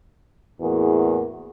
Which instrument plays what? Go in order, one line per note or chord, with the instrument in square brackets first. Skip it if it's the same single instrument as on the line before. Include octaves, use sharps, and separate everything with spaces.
[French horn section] E2 A2 A#3 F#4 G#4